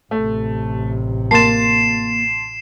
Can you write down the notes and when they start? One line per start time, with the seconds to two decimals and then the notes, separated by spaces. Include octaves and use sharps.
0.11 A1 C3 A3
1.31 A#3 A5 C6 A6 C7 E7